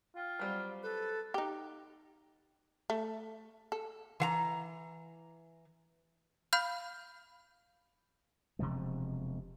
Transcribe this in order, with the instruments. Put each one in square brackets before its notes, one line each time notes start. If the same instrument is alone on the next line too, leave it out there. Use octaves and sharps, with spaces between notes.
[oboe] F4 [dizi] G5
[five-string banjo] F#3 G3 C4
[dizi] A4 [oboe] B4
[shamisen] D#4 G4
A3
A4
[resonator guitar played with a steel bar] E3 F5 A#5
[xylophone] F5 B5 F6 G6
[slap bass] E1 C3 F3 G#3